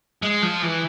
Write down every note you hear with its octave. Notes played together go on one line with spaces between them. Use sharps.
G#3
F3
E3